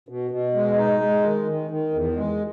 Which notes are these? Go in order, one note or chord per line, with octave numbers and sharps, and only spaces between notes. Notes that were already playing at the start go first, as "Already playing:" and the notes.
B2
B2
G#3
D#4
G#3
D#3
D#3
D#3
E2
G#3